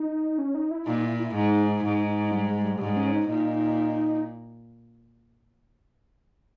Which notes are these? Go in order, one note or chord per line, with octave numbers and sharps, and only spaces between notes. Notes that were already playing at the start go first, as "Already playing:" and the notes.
Already playing: D#4
C#4
D#4
E4
A#2 D#4
E4
E4
G#2 D#4
G#2
G3
G#3
G3
G#3
G#2 G3
C#4
D#4
A#2 D#4